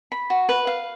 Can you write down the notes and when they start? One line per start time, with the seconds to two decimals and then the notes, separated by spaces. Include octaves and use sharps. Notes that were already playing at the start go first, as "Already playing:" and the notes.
0.12 B5
0.30 F#4
0.49 B4
0.67 F5